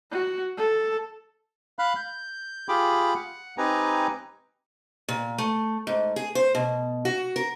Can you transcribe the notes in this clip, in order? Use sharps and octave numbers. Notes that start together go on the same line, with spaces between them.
F#4
A4
F5 B5 F#6
G6
F4 G4 G#4 G5 B5 D6
F#5
C4 D#4 G4 B4 G#5 A#5
A#2
A3
G#2
G#4
C5
B2
F#4
A#4